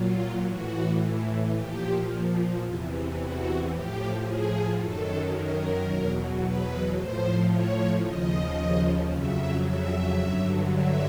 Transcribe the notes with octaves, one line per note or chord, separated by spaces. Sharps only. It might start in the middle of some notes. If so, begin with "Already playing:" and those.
Already playing: A#2 F#3 F4
A2 E3 F#4
A#2 F3 G4
E2 C3 E3
F#4
A2 F3 G4
G#4
F#2 D#3 F#3 A4
A#4
E2 B2 F#3
B4
A2 F3 C5
C#5
D#2 C#3 F3 D#5
F2 C#3 F#3 E5
E5
G2 D3 F#3
E5